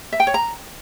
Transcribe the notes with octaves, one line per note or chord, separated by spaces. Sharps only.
E5
G5
C#5
A#5